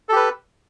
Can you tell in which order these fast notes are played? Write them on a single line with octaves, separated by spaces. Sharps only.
A4 G4 B4